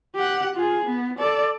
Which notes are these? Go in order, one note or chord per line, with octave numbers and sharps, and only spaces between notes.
G4 F#5
F4 G#4
B3
A4 D5